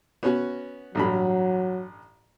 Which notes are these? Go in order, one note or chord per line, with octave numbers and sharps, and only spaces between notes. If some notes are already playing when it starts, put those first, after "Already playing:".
B3 C#4 F#4
A1 G2 F#3 B5